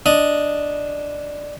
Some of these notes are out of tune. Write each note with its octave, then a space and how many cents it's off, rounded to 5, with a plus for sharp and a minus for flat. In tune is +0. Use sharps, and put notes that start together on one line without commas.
D4 +0 D#5 +0